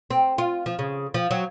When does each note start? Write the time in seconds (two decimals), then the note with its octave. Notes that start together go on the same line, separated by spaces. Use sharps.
0.11 C4
0.38 F4
0.66 F3
0.79 C#3
1.14 F3
1.31 F#3